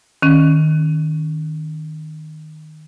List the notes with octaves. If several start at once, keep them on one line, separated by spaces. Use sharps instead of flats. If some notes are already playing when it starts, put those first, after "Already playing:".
D#3 C#4